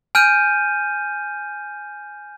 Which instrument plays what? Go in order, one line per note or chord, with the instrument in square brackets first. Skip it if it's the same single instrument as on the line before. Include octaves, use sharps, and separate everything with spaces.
[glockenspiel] G#5 F6 G6 D#7